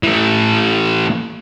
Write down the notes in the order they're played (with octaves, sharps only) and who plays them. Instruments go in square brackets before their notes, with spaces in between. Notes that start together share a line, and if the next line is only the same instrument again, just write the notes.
[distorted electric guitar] E3 A3